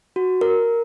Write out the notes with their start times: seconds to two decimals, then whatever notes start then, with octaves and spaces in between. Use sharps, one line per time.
0.16 F#4
0.41 A#4